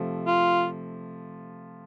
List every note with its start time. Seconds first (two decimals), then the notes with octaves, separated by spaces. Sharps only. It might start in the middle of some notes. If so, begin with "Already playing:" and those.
Already playing: C3 F3 A3
0.27 F4